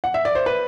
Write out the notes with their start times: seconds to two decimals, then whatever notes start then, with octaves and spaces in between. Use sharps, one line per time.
0.04 F#5
0.14 E5
0.25 D5
0.35 C5
0.46 B4